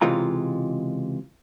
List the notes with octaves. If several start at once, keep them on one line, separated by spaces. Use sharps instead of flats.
C#2 C3 E3 G#3 F4 A#5